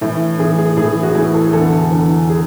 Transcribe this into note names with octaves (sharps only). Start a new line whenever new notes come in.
A2 E3 A3
A2 E3 G#4
G#4
A2 E3 G#4
F#4
A2 E3 G#4
A4
E2 D3 A4
E2 D3
G#4